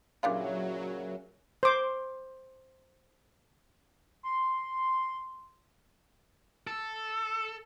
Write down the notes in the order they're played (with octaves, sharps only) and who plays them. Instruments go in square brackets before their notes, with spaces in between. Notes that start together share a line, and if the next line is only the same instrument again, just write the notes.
[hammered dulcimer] A#2 C#3 E3 [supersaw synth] F#3 [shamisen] G3 D4 F4
[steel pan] C5 D6
[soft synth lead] C6
[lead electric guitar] A4